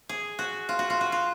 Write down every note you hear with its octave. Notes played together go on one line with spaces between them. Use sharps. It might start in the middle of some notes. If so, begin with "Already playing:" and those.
G#4
F#4
F4
F#4
F4
F#4
F4